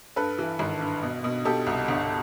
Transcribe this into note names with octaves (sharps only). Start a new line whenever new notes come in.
G2 A4 B4
E3
G#1
G2
B2
B2
B2 G4 A4
C2
G1